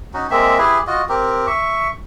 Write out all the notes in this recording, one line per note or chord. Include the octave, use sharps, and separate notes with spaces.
C#4 D#4 F#4
G#3 A#3 C4 E5
E4 G4 G#4 B4
F4 F#4 D#5
C4 G4 A#4
E5 C#6